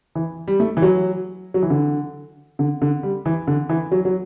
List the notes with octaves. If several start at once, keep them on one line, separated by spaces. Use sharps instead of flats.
E3
G3
A3
E3
F#3
F#3
E3
D3
D3
D3
G3
E3
D3
E3
F#3
F#3